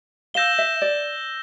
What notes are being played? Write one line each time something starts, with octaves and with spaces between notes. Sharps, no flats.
F5 E6 G6 A#6 E7 G7
E5
D5